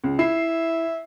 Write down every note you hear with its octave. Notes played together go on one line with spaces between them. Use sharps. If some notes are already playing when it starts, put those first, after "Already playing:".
C#2
E4 E5 C7